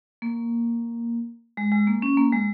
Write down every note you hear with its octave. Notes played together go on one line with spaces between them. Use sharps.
A#3
G#3
G#3
A#3
C#4
A#3
G#3